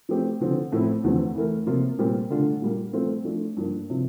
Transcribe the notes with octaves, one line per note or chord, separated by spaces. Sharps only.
F3 A3 C4 G4
D3 F3 C4
A2 F3 A3 C4 E4
E2 D3 F3 A3 C4
E3 A3 E4 A#4
C3 F3 A#3 F4
A#2 G3 C4 G4 A#4
D3 A3 D4 F4
A#2 G3 A#3
F3 A3 C4 F4 A4
F3 A3 D4
G2 F3 A#3 D4
C3 F3